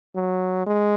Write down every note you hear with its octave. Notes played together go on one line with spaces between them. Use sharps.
F#3
G#3